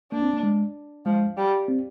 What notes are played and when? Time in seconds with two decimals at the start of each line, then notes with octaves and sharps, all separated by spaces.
0.12 A#3 D4
0.23 C4
0.33 A#3
0.43 G#3
1.05 F3 G#3
1.37 G3
1.68 C4